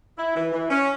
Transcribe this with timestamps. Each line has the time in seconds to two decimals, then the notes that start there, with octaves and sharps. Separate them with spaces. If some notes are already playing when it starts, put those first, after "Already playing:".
0.18 E4
0.36 E3
0.53 E3
0.71 C#4